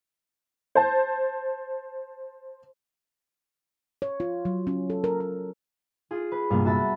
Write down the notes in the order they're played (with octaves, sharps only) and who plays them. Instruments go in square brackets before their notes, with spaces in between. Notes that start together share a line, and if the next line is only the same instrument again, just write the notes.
[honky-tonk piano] C5 A5
[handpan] C#5
F4
F#3
C#4
A4
A#4
A#4
[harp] F4 G#4
B4
C2 G2 A#2 G3 A#3 B3
F#4 E5 A5 B5